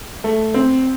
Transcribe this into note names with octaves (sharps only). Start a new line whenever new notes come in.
A3
C4